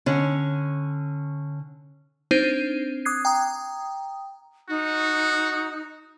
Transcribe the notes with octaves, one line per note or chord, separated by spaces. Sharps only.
D3 C#4
C4 D4 D#4 C5
D6 D#6 F#6 G#6 C7
G5 A#5 D#6
D#4 F#4